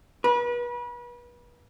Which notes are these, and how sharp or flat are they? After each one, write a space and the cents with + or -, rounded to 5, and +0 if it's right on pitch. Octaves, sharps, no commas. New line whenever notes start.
B4 -35